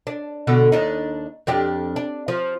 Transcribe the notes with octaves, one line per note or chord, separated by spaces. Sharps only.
D4
B2 D3 A4
D#2 D4 D#4
F2 D4 G4
D4
F3